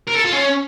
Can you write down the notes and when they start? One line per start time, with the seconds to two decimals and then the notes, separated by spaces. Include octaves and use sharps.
0.07 A#4
0.16 A4
0.24 F4
0.32 C#4